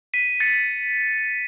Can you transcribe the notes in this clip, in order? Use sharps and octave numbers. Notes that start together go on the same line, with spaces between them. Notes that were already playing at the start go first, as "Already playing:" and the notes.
B6 D#7
A6 C#7